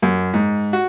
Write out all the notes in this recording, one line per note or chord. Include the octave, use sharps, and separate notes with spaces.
F#2
G#2
F#4